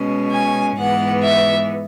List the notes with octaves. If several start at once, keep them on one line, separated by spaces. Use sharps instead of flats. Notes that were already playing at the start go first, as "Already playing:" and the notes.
Already playing: B2 G#3 C#4
G#5
G#2 E3 B3 F#5
E5